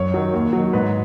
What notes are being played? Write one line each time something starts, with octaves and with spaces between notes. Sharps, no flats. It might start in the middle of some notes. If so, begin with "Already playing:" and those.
Already playing: F#2 C#5
D#3 F#3
D#2
D#3 F#3
G#2 B4